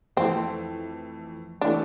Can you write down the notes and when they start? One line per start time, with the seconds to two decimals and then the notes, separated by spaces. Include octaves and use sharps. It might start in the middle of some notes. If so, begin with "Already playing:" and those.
0.17 F2 E3 A3 C4
1.61 E3 A3 D4